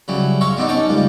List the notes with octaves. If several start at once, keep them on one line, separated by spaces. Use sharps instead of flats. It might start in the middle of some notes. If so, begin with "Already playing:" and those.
C#3 F#3 G3 E4
C#5 E5 F5 A#5 C6 C#6
G3 B3 C4 D4 D#4
C#4 D#4 C#5 D#5 G5 A5
C#2 G3 A#3